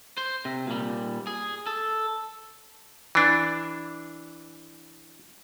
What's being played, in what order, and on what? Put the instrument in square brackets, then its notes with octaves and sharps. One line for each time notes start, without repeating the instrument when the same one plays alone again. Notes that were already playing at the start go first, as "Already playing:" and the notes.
[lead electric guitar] C5
C3
A#2 G3
G#4
A4
[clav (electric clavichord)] E3 D4